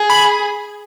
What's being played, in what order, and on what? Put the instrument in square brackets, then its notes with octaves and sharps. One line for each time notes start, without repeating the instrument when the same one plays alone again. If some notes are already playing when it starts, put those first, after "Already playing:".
Already playing: [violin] G#4
[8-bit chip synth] B5